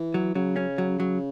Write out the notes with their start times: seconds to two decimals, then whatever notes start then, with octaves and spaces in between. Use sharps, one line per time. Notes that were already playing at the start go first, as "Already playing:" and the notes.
Already playing: E3
0.14 F#3
0.35 C#3 F#3
0.56 C#4
0.78 F#3
1.00 F#3